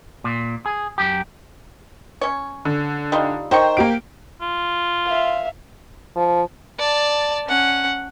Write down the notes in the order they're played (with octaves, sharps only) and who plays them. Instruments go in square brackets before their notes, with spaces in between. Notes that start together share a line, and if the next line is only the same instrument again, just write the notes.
[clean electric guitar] A#2
G#4
F#2 G4
[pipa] C#4 C#5
[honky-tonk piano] D3
[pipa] G3 D#4 F4
[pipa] D#3 G5 C#6 [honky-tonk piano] C5
[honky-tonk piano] A#3 G4 D7
[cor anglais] F4
[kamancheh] E5 F5
[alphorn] F3
[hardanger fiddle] D5 A5
C#4 F#5